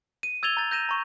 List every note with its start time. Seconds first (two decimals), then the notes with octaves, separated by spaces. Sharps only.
0.23 D#7
0.43 E6 G#6 A6 F7 G7
0.57 A#5 G6 A6
0.71 G6 A#6 D#7 E7
0.89 A#5 C#6